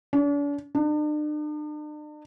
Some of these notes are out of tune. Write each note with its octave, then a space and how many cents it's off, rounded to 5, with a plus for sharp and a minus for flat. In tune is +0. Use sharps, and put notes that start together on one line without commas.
D4 -40
D4 +45